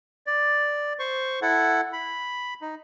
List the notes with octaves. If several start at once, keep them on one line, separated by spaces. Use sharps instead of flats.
D5
C5 C#6
E4 A4 F#5
B5
D#4